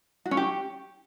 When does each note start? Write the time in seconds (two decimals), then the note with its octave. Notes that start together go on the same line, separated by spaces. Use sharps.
0.26 F#4
0.31 C#4
0.37 G4